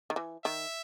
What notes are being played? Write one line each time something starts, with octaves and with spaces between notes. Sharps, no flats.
D#3
E3
D#3 E5